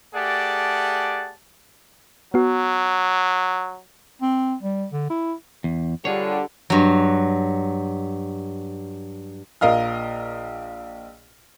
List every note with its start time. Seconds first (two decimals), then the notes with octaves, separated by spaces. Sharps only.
0.15 A3 G4 G#4 D5 F#5 A5
2.34 F#3 B3 F#4
4.22 C4
4.63 G3
4.92 D3
5.10 E4
5.64 E2
6.05 D3 G3 F4 G#4 C#5
6.70 G2 F#3
9.61 A#1 F4 A#4 D#5 F5 F6